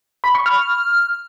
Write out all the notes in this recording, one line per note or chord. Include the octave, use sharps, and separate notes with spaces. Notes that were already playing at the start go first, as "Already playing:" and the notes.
B5
C#6
F6